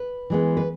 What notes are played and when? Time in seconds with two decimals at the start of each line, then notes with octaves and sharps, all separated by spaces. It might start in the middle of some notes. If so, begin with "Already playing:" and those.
Already playing: B4
0.30 E3 G#3 B3
0.57 B4